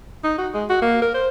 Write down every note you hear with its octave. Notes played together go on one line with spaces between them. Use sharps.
D#4
F#4
G#3
F#4
A#3
A#4
C5